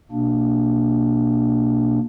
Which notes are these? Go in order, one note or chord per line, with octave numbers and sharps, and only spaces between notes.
B2 A#3 D4